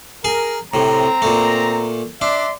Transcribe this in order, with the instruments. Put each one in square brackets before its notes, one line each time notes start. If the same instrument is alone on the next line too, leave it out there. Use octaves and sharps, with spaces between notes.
[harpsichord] G#4 G#5 [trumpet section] A#4
[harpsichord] A2 C3 [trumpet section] C4 A#5
[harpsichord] A#2 A3
[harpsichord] D4 [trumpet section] D5 E5 C6